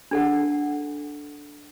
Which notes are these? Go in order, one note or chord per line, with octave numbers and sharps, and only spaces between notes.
D4 A4 F#5